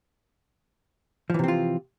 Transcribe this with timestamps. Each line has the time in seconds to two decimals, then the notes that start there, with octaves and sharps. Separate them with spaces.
1.30 F3
1.34 E3
1.39 C3
1.44 C4
1.48 F4